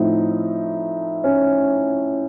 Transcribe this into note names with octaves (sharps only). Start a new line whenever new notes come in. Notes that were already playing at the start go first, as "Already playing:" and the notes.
Already playing: A2 F3 A3 C4 D#4
C#4